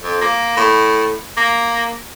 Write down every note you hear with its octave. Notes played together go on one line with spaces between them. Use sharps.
F2
A#3
A2
A#3